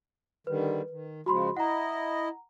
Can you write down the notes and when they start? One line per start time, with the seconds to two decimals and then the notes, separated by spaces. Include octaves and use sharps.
0.47 D3 D#3 G3 B4
0.90 D#3
1.26 C#3 F3 G#3 F#4 B5 C6
1.57 E4 D#5 F#5 A#5